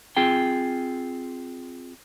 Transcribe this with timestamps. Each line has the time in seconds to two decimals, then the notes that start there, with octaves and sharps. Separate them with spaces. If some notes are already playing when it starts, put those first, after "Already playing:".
0.17 C4 F4 G#4 G5